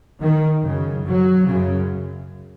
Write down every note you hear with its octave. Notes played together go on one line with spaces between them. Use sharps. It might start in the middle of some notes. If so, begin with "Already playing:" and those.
D#3
F#2 C#3
F#3
F#2 C#3